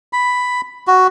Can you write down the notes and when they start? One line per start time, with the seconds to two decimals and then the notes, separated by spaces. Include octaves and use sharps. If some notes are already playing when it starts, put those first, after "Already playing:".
0.13 B5
0.87 F#4